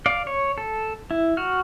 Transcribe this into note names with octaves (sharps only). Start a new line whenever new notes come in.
D5 F5
C#5
A4
E4
F#4 F6